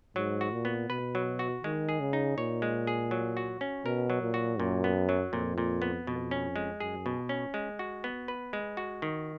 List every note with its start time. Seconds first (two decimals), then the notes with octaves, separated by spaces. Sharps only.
0.16 G#2 F#3
0.41 F#4
0.52 A#2
0.65 B3
0.90 B2 B4
1.15 F#3
1.39 F#4
1.64 D#3 G#3
1.89 G#4
2.00 C#3
2.13 D#4
2.37 A#2 C#5
2.62 G#3
2.87 G#4
3.11 F#3
3.37 F#4
3.61 C#4
3.85 B2 A#4
4.10 F#3
4.23 A#2
4.34 F#4
4.59 F#2 A#2
4.84 B3
5.09 F#3
5.33 F2 A#2
5.58 A#2
5.82 B3
6.07 F2 B2
6.31 C#4
6.56 G#3
6.80 F#2 G#4
7.06 B2
7.29 C#4
7.54 G#3
7.79 F#4
8.04 B3
8.28 B4
8.53 G#3
8.77 F#4
9.02 D#3